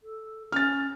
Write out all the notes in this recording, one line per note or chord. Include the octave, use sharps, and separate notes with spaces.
A4
C#4 F6 A6